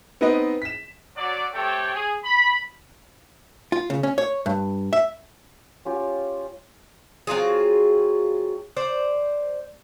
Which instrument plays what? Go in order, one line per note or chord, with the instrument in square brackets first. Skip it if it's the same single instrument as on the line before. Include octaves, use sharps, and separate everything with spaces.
[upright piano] B3 C4 D#4 B4 D#5
B6 E7
[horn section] F#3 D5
A3 C4 G4 A4 C#5 G5
G#4
B5
[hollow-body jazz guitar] F4
C#3
C#4
C#5
G2
E5
[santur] C#4 F4 G4 C#5
[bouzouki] F#3 C4 F4 G#4
C5 D5